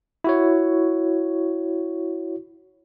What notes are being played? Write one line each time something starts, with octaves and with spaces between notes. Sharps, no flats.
E4 F#4 C#5